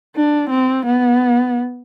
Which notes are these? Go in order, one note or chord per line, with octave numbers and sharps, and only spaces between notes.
D4
C4
B3